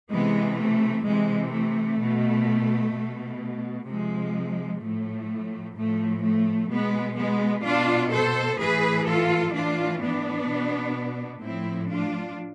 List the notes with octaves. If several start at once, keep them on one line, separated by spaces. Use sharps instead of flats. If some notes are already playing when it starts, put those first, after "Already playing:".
C3 E3 G#3 B3
A3
C3 E3 G#3
A3
B2
B2
C3 F3 G#3
A2 F3 A3
A2 F3 A3
A3
B2 G#3 B3
G#3 B3
B2 D4 F4
A4 C5
A2 E3 G#4 B4
F4 A4
A2 E3 D4 F4
B3 D4
B2
A2 F3 C4 E4
D4 F4